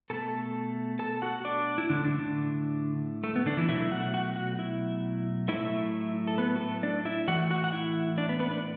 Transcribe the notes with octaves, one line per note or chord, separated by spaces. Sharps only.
B2 A3 A4 A5
A4 A5
F#4 F#5
D4 D5
E4
A2 D3 A3 D4
D3 D4
D3 D4
A3
B3
D3 D4
E3 E4
B2 F#3 A3 E4 E5
F#4 F#5
F#4 F#5
F#4 F#5
E4 E5
A2 F#3 A3 E4 E5
A4
B3 B4
F#4
A3 A4
D4 D5
E4 E5
A2 E3 A3 F#4 F#5
F#4 F#5
F#5
E4 E5
D4 D5
B3 B4
B3 B4
D4 D5